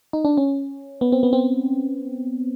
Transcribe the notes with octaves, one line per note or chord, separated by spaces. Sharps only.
D#4
D4
C#4
B3
C4
B3
C4